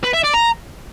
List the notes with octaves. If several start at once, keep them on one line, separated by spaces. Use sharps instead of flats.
B4
E5
D5
A#5